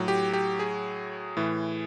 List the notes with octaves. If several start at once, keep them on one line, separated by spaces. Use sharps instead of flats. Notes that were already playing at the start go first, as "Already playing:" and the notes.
Already playing: A2 F#3
G4
G4
G#4
A2 E3